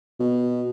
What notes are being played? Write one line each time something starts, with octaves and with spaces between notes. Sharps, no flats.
B2